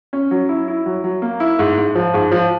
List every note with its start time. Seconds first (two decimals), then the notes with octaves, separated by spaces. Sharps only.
0.13 C#4
0.31 F#3
0.49 E4
0.68 E4
0.86 F#3
1.04 F#3
1.22 A#3
1.40 E4
1.59 G#2
1.77 G#2
1.95 F3
2.14 G#2
2.32 F3